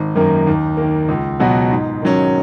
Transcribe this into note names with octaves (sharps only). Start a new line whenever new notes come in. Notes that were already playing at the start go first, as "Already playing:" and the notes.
Already playing: G#1
F#2 D#3 A#3
D#2
D#3 A#3
C#2
B2 F#3 B3 F#4
G#2
D#3 F#3 C#4